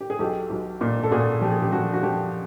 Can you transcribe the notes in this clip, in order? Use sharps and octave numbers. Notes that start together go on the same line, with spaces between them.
G4
G#4
B1 G4 A4
B1
A#2
A4
A#2 F#4 G#4
F3 G4
G#4
G4
F3 F#4
F#4
F3 G4